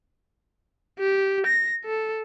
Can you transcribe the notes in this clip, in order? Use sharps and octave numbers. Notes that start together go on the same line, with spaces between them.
G4
A#6
A4